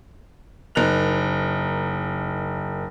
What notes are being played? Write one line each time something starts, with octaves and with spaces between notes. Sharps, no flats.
F#1 D#4 A#4 F#6 F7